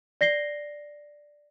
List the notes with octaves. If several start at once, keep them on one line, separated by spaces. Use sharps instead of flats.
D5 A#6 C7 G7